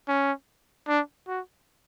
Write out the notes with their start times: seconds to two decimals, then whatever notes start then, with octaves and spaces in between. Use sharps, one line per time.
0.08 C#4
0.88 D4
1.28 F#4